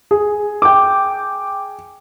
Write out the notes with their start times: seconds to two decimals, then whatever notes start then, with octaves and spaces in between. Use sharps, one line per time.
0.11 G#4
0.62 G5 D6